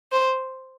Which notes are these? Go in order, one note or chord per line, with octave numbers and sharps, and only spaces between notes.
C5